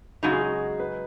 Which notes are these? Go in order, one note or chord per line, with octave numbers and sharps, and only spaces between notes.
F#2 C#3 G#3 D#4 F#4
G#4
F#4
B4